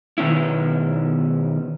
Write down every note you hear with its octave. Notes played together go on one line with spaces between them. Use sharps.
B2 D#3 C#4 E4